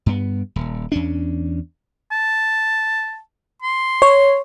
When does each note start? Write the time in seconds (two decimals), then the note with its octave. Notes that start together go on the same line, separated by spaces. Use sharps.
0.06 G2 B3
0.56 D#1
0.92 E2 C#4 D4
2.12 A5
3.63 C6
4.02 C#5